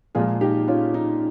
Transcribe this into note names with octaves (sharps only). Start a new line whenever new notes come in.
A#2 F3 G#3 F4 G#4
D#4 G4
C#4 F4
D#4